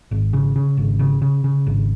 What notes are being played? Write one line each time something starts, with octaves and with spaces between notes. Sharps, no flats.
G#1
C#3
C#3
G#1
C#3
C#3
C#3
G#1